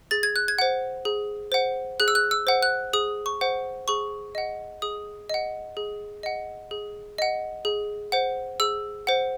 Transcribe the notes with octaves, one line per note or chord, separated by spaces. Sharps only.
G#4 A6
G#6
F#6
G#6
C5 F#5
G#4
C5 F#5
G#4 F#6
E6
F#6
E6
C5 F#5
F#6
G#4 D#6
C#6
C5 F#5
G#4 C#6
D#5 F#5
G#4 D#6
D#5 F#5
G#4
D#5 F#5
G#4
D#5 F#5
G#4
C5 F#5
G#4 E6
C5 F#5